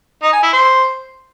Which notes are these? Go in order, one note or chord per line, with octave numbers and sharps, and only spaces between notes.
D#4
G#5
E4
C5